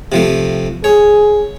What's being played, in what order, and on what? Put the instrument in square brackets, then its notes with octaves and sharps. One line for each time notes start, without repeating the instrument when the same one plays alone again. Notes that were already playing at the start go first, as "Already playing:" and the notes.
[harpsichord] C3 F3 A3
[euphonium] G#4 [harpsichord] C#5